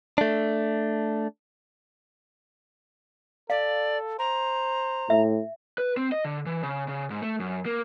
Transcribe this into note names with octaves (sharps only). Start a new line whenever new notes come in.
A3 D4
A4 D5 F5
C5 A#5
A2 E5
B4
C4
D#5
D3
E3
C#3
C#3
G#2
A3
F#2
A#3